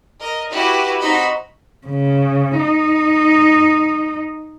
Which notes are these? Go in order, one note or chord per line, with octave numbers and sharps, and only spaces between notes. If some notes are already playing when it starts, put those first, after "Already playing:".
A#4 D#5
E4 F#4 G4 B4
C4 D#4 F#4 D#5 B5
C#3
D#4